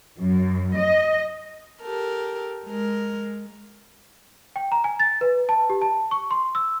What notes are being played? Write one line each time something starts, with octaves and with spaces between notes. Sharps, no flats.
F#2
D#5
G4 A4 A#4
G#3 A#4
G5
A#5
G#5
A6
B4
A5
G4
A5
C#6
C6
E6